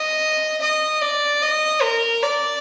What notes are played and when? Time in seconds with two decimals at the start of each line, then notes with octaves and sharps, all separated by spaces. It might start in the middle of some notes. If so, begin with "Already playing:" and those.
Already playing: D#5
0.61 D#5
1.01 D5
1.42 D#5
1.82 A#4
2.23 D5